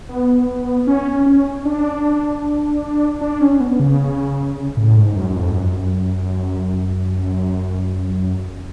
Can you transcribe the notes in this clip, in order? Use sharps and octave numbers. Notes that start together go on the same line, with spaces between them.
B3
C#4
C#4
D4
D4
C#4
B3
C#3
A2
G#2
F#2
F#2
F2
G#2
F#2